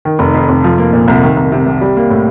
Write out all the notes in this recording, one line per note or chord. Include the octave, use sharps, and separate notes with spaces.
D#3
F1
F2
F1
F3
A#3
A#2
C2
D#3
C2
C3
C2
G3
A#3
A2